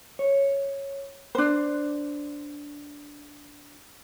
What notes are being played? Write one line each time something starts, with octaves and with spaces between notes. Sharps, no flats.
C#5
D4 C5